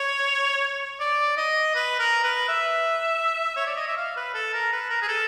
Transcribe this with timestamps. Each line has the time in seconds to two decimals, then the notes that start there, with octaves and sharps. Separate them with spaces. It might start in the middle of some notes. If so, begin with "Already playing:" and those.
Already playing: C#5
1.00 D5
1.37 D#5
1.75 B4
2.00 A#4
2.24 B4
2.49 E5
3.56 C#5
3.67 D5
3.77 D#5
3.88 E5
3.97 F5
4.17 B4
4.34 A4
4.54 A#4
4.72 B4
4.90 A#4
5.02 G#4
5.08 A4